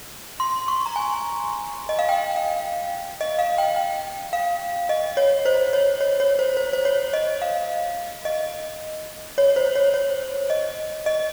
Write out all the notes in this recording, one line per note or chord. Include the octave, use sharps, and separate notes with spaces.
C6
C#6
A#5
G#5
D#5
F5
G5
F5
D#5
F5
G5
G5
F5
D#5
C#5
C5
C#5
C#5
C#5
C5
C5
C5
C#5
D#5
F5
D#5
C#5
C5
C#5
C#5
D#5
D#5